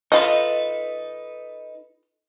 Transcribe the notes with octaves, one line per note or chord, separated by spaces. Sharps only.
D#4 F4 A4 B4 D#5